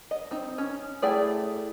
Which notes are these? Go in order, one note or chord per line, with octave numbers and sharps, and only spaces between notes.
D#5
C4 D#4
C#4
A3 E4 G#4 D5 G5